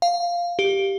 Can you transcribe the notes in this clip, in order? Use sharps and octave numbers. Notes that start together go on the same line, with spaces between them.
F5
G4